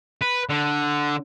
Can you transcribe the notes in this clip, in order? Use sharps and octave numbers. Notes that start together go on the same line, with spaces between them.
B4
D3